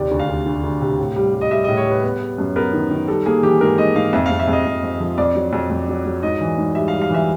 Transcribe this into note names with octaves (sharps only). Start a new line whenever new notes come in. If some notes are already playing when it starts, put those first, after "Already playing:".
Already playing: D#2 C3 D5
D2
F5
D2
D2
D2
C3
A2
G3
G3
D#5
G3 E5
A2 D#5
C#5
G3 B4
B3
B3
F#2
B3 A#4
D#3
D#3
G3 A4
A#3 G#4
E3 G4
G#2 A#4
G#2 D#5
G#2 F5
F2 E5
F2 F5
E5
F2 D#5
F2
F2
F3
F2 D5
F#3
F2
F2
F#3
F#3
G#2 D#5
E3
G#2
G3 E5
G3 F5
F5
E3 E5